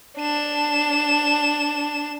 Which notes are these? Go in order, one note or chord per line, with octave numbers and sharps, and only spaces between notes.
D4 E7